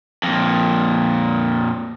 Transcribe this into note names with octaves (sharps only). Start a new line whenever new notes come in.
F2 A#2